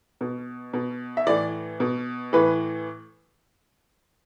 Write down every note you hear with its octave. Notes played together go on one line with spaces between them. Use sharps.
B2
B2
E5
A2 E3 D5
B2
A2 E3 B4